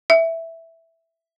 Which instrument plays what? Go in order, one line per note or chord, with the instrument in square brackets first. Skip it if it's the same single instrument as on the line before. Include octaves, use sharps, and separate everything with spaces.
[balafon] E5